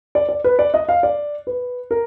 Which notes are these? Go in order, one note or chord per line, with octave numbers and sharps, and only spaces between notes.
D5
D5
B4
D5
D#5
F5
D5
B4
A#4